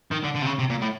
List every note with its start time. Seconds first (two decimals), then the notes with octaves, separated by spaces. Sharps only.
0.11 D#3
0.23 D3
0.35 D3
0.42 C3
0.46 C#3
0.59 C3
0.70 A#2
0.82 A2